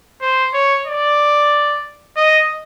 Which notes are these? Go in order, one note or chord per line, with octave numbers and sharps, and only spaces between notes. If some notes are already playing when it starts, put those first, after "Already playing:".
C5
C#5
D5
D#5